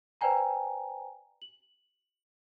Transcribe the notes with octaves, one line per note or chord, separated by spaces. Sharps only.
B4 C5 D5 G5 G#5 A#5
F#7